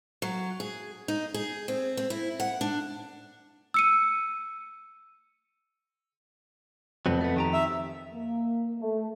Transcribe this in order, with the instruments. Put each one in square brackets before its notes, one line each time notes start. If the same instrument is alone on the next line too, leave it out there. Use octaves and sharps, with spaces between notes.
[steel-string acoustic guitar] F#3
G#4
D#4
G#4
C4
C4
E4
F#5
D4
[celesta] E6 C#7 D#7
[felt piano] F2 [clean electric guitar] F#3 B3 C4
[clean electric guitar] A3 B3
D#3 G4 A#5
[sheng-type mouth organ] E5
[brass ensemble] A#3
A3